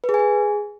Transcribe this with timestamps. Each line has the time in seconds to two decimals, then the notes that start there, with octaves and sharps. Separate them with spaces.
0.04 B4
0.09 G#4
0.14 G#5
0.19 G#4